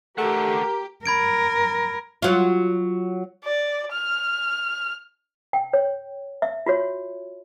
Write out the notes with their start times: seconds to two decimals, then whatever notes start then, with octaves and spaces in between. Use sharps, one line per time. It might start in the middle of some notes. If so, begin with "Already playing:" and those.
0.18 A3 G4 A4 A#4 F#5
1.06 A#4 B5 G#6 D7
2.22 F#3 F4
3.45 D5
3.92 F6
5.53 G5
5.73 C#5
6.42 E5
6.66 F4 F#4 C#5